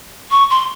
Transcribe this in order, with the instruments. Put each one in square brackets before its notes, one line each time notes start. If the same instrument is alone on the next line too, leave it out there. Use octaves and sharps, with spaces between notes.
[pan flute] C#6
C6